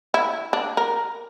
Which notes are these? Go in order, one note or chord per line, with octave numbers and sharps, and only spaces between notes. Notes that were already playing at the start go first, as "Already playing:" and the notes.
E4
D4
A#4